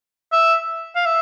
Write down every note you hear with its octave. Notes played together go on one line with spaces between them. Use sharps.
E5
F5
E5